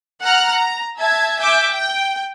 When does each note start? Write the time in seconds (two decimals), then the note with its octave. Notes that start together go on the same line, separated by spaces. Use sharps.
0.22 F#5 A#5 F6 F#6
0.51 A#5
0.98 E5 A5 G#6
1.39 E5 G#5 D6 G6
1.70 G5